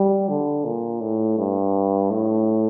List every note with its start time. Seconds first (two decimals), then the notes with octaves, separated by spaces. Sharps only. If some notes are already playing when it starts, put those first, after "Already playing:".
Already playing: G3
0.29 D3
0.65 A#2
1.01 A2
1.38 G2
2.10 A2